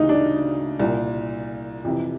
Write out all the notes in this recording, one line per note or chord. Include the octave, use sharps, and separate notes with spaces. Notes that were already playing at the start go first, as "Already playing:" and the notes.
Already playing: D2 C#3 E3 D#4
D4
C2 A#2
F2 C3 E3